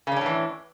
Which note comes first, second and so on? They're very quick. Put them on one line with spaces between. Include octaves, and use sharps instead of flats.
C#3 D4 C#4 A2 E3